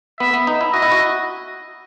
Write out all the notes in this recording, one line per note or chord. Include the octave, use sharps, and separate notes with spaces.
B3 E5
B3
D#4
E4
F#4 D#5
E4
F#4